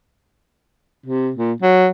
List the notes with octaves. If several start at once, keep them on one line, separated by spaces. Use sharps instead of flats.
C3
A#2
F#3